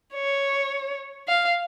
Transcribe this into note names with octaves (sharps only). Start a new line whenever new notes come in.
C#5
F5